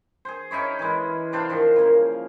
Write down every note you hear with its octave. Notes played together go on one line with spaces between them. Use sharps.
G#4 C5
C#4 D#4 E4 C#5
E3 G#3
C3 D4 C5 F5
D#3 F3
C#3 A#3